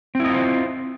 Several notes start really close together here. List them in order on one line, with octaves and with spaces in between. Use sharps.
C4 E4 D#5 F4 C5